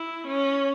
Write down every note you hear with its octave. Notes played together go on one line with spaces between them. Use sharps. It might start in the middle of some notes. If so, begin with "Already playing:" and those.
Already playing: E4
C#4